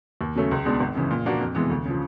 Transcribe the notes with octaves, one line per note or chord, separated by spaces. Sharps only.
D#2
C#3 F#3 A3 C#4
C#2
B2 G#3 B3 D4
G#1
F#2 C#3 E3
A#2
F3 A#3 D4 F#4
F2
C3 E3 G#3 B3
D2
C#3 F3